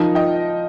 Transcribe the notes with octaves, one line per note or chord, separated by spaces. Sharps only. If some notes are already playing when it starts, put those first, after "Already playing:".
Already playing: F3 D#4 A#4 D#5
D#5 G5